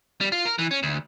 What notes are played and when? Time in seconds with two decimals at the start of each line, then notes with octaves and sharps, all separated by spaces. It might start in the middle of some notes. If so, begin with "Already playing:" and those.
0.21 G3
0.32 F4
0.45 A#4
0.58 E3
0.71 C#4
0.83 D2